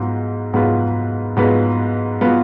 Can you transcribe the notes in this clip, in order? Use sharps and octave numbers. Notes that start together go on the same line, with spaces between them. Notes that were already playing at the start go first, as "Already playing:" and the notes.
Already playing: G#2 F#3 B3 F4
G#2 F#3 B3 F4 B4
G#2 F#3 B3 F4 B4
F#3 B3 F4 B4